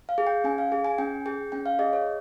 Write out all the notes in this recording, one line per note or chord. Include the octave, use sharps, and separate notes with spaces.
F5
G#4
G5
C#4 G#5
F5
G#4
G#5
C#4 G5
G#4 G5
C#4 G5
F5
G#4 D#5
C#5